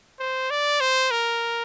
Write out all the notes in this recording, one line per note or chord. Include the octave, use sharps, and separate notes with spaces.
C5
D5
C5
A#4